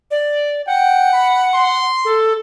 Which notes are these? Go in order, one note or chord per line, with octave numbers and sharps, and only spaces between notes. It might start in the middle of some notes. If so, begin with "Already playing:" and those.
D5
F#5 G5
B5
C6
A4